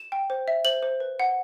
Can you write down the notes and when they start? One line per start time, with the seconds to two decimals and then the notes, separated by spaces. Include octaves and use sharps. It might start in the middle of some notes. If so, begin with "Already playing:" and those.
Already playing: E7
0.12 G5
0.30 C5
0.48 E5
0.65 C5 F#7
0.83 C5
1.00 B4
1.20 F#5